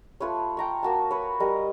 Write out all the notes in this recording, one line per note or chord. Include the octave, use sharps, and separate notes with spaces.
A3 F4 B4 C#5
G5 A#5 C#6
A#3 F#4 A5
B4 C#5
G3 A#4 D#5